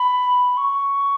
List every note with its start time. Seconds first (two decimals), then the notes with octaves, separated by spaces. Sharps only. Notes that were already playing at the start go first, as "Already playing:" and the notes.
Already playing: B5
0.57 C#6